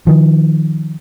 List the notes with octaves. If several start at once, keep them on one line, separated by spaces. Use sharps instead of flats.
D#3 F3